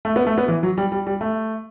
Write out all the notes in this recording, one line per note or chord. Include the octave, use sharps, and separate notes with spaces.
A3
B3
A3
B3
E3
F#3
G3
G3
G3
A3